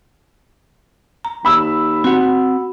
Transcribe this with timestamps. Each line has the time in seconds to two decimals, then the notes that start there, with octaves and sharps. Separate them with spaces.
1.25 A#5
1.45 D#2 B5 E6
2.04 C4 F#4 F#5